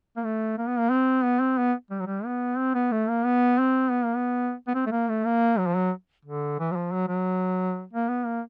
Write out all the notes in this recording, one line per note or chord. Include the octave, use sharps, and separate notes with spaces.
A#3
A3
A#3
B3
A#3
C4
B3
C4
B3
G3
F#3
G3
B3
C4
B3
A3
A#3
B3
C4
B3
A#3
B3
B3
C4
A3
A#3
A3
A#3
F#3
F3
F#3
D3
E3
F#3
F3
F#3
F#3
A#3
B3
A#3